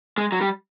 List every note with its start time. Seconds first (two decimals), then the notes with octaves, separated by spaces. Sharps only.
0.18 G#3
0.32 F#3
0.41 G3